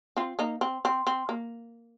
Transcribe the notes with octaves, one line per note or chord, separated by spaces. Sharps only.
C4 F4
A#3 D#4
C4
C4
C4
A#3